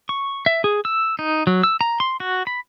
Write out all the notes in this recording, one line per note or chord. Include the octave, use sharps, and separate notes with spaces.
C#6
E5
G#4
E6
D#4
F#3
E6
A#5
C6
F#4
B5